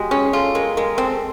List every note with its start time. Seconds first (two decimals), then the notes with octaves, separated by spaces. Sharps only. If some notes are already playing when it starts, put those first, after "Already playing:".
Already playing: G#3 F#4 G4
0.11 C#4 G#4
0.25 G#4
0.33 F4 A4
0.54 G#3 A#4
0.77 G#3 A#4
0.98 C4 A4